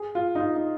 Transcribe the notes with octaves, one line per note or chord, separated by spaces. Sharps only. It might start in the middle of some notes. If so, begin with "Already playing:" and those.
Already playing: G#4
F4
D#4
F4
D#4